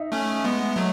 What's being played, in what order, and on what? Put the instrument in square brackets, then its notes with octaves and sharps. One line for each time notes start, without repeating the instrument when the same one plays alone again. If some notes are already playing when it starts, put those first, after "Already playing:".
Already playing: [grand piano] D#4 E5
[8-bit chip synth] A3 C#4
G#3 B3
F#3 A3